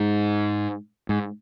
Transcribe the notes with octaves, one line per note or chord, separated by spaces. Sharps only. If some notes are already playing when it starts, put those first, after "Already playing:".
Already playing: G#2
G#2